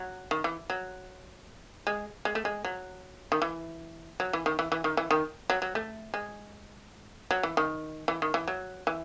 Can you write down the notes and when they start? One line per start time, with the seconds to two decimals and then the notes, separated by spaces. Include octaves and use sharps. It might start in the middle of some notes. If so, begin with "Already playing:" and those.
Already playing: F#3
0.31 D#3
0.44 E3
0.70 F#3
1.87 G#3
2.25 G#3
2.35 A3
2.45 G#3
2.65 F#3
3.32 D#3
3.42 E3
4.20 F#3
4.33 E3
4.46 D#3
4.59 E3
4.72 E3
4.84 D#3
4.97 E3
5.11 D#3
5.50 F#3
5.62 F#3
5.75 A3
6.14 G#3
7.31 F#3
7.43 E3
7.57 D#3
8.08 E3
8.22 D#3
8.34 E3
8.48 F#3
8.87 E3